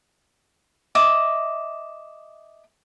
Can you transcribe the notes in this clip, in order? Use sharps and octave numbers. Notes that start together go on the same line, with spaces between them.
D#5 E5 D6